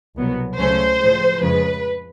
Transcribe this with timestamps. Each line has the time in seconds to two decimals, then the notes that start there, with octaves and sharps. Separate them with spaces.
0.17 C2 B2 F#3 B3
0.58 C#2 C#3 F#3 A3 C#4 C5
1.00 A2 F3 G#3
1.41 F2 C#3 F3 G#3 B4